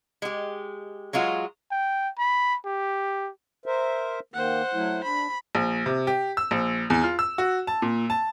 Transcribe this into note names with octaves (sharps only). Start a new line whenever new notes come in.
G#3 G4
F#3 G#3 F4 F#4
G5
B5
G4
A#4 C5 E5
D#3 A#3 C5 F#5
F#3 A3 E4
D4 B5
A#1
C3
G4
E6
A#1
E2
F4
E6
F#4
A5
A#2
A5